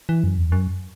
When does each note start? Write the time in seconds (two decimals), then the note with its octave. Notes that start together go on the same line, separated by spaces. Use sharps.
0.09 E3
0.24 F#2
0.38 E2
0.52 F#2